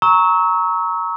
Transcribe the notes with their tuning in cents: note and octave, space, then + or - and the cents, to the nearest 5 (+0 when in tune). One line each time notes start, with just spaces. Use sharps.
A#5 +0 C#6 +0 E6 -35